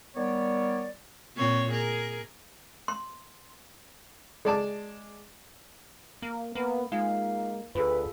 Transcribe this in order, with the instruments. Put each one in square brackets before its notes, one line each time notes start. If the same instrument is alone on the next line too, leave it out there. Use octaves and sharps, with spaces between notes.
[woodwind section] D#3 G3 B3 C#5 D5
[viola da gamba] A#2 C4 C#5
G#4 A#4
[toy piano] C6
[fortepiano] G#3 D5 A5 D6
[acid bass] A#3
[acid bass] A#3 [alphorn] B3
[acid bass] G#3 [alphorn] A#3 [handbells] D#4 F4 F5
[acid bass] D2 [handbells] F4 G#4 A4 [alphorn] B4